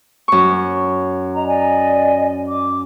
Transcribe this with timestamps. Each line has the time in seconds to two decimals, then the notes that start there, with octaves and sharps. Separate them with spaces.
0.28 F#2 C#6
1.34 D#5 A#5
1.45 D5 D#5 G#5
2.49 D6